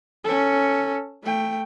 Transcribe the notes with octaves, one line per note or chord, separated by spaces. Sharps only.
C#4 A4
A3 G5